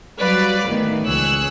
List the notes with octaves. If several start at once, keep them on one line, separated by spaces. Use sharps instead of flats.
F#3 G3 F#4 B4 D5 F5
A2 D#3 E3 B3
C#2 G#4 C#5 E6 F#6